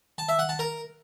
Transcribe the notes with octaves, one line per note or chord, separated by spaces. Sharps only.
A5
E5
F#5
A5
A#4